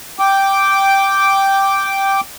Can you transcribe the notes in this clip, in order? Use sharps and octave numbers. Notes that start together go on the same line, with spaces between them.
G5 D6